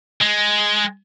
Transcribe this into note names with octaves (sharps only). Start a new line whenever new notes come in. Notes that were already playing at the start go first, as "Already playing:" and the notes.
G#3